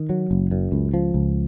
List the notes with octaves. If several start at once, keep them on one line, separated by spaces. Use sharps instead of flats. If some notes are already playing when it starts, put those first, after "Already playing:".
Already playing: D#3
F#3
F#1
F#2
C#2
F3
C#2